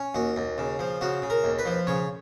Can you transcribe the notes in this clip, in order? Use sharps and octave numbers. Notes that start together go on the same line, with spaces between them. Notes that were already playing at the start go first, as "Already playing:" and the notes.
Already playing: C#4
D#2 F#4
D#2
C#3
F3
C#3 F#4
C#3
A#4
D#2
B4
F3
C#3 C#5